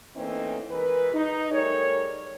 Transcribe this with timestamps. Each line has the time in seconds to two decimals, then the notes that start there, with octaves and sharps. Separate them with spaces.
0.16 E3 A3 A#3 C4 C#4 D#4
0.71 E3 G#3 A#4 B4
1.14 D#4
1.51 G3 A3 G#4 A#4 C#5